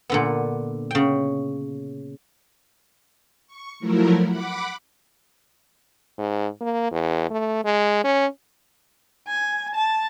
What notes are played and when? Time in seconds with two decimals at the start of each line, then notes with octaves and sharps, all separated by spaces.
0.10 A#2 D3 B3
0.91 C#3 G5
3.47 C#6
3.80 F3 F#3 A3 E4 A#4
4.27 F#5 B5 D6
6.18 G#2
6.61 A#3
6.92 E2
7.31 A3
7.65 G#3
8.04 C#4
9.28 G#5
9.75 A5